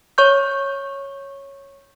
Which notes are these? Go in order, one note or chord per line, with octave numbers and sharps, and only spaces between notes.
C#5 C#6 G6